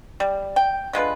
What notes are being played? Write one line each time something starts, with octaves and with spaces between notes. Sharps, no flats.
G3
G5
D3 G#3 F4 B4